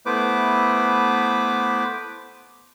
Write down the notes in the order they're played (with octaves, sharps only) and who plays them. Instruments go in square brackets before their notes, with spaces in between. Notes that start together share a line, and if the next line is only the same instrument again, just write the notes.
[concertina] A3 B3 E4 B4 C5 D6